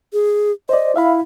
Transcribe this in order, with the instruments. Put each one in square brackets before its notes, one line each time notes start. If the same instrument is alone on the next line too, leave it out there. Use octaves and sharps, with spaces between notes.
[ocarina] G#4
[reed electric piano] C5 D5 [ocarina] D#5
[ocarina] E4 [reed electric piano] E5 F5 B5